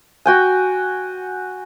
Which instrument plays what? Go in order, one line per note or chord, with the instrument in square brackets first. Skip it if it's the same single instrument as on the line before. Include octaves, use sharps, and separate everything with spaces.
[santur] F#4 G5 G#5